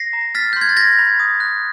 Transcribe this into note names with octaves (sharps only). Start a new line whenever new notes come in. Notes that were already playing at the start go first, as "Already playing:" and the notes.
Already playing: A#6 C7
A#5
F6 A6 B6
G6
C6 G#6
A6
G6 G#6 A#6
B5
D#6
F#6